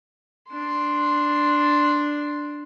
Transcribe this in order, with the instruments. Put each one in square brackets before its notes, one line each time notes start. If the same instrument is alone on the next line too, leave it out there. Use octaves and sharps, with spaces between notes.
[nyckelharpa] D4 C6